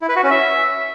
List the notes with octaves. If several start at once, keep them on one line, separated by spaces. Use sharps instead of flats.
E4
B4
F#4
C#4
E5